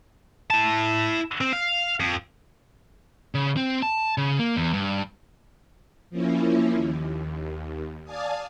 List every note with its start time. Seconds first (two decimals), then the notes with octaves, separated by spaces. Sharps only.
0.50 E4 A5
1.41 C4
1.53 F5
2.00 F2
3.35 C#3
3.57 C4
3.82 A5
4.18 C#3
4.39 A#3
4.56 E2
4.73 G2
6.10 F3 A#3 C#4 E4
6.73 D#2
8.04 D5 F5 G#5 A5 D#6